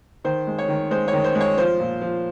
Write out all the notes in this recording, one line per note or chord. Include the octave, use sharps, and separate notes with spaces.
D#3 C5
G#3
C#5
D#3
G#3 C5
C#5
D#3
C5
G#3
C#5
F3 C5
A#2
F3